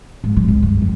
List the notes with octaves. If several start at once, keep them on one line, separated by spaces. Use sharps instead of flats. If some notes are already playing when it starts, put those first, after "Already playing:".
G#2
D3 F3
C#2
G2
F2